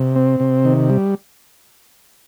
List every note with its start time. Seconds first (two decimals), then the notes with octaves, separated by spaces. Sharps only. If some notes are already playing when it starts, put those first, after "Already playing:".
Already playing: C3
0.16 C4
0.40 C3
0.65 D#3
0.90 G3